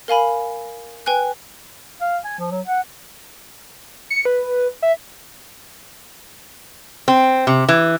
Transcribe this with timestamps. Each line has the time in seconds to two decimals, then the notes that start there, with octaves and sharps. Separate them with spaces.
0.08 A#4 F5 G#5 B5
1.06 B4 G5 G#5 F#6
2.00 F5
2.24 G#5
2.39 F3
2.51 F#3
2.67 F#5
4.10 C#7
4.25 B4
4.82 E5
7.08 C4
7.47 C3
7.69 E3